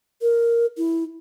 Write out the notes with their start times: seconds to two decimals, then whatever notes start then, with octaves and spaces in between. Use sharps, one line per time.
0.22 A#4
0.78 E4